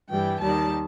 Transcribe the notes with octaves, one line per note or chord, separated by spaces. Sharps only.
G2 E3 G3 G5
D#2 D#3 G3 A5